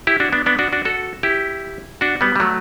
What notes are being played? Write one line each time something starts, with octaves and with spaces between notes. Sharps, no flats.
E4 G4
D4 F#4
B3 D4
B3 D4
D4 F#4
D4 F#4
F#4 A4
E4 G4
D4 F#4
G3 B3
G3
F#3 A3